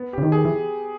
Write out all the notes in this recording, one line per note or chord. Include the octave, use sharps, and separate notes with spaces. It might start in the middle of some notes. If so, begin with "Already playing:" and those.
Already playing: B3
C#3 G4
D#3
G#4
E3